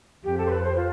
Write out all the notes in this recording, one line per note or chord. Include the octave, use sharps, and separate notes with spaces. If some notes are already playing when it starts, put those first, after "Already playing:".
F2 G4
A4
C5
B4
C5
F4